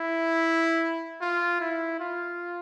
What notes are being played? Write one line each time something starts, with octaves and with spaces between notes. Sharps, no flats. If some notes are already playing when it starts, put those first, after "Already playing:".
Already playing: E4
F4
E4
F4